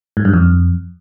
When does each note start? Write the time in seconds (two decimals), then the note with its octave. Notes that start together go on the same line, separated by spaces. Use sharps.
0.17 G#2
0.25 G2
0.34 F2